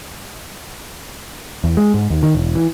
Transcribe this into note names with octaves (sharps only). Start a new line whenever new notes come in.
E2
G#3
G#2
D#2
D#3
E1
E3